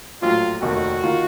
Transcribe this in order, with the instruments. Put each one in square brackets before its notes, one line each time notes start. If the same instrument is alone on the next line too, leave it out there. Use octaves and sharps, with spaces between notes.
[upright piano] A#1 A2 F#3 [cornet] F4
[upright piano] F1 D#2 D#3 A#3 [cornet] F#4
[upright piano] D#3 A#3 F4